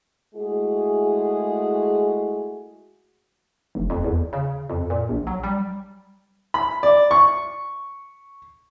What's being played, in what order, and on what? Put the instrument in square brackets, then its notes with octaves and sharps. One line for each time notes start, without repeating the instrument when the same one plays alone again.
[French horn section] G#3 A3 E4 F#4 G#4
[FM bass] F1
F2
E2
C#3
F2
A#2
A#1
F#3
G3
[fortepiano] B5
D5
C#6